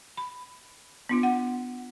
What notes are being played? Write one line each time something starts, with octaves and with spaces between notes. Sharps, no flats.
B5
B3 D4 F4
F#5